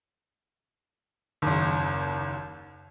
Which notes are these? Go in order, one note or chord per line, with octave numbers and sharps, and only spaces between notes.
F#1 D#2